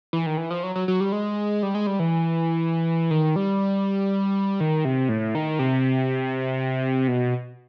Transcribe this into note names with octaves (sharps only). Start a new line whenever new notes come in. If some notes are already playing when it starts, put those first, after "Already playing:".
E3
D#3
E3
F3
F#3
F#3
F#3
G3
G#3
G3
G#3
G3
E3
D#3
G3
D#3
C3
A2
D#3
C3
B2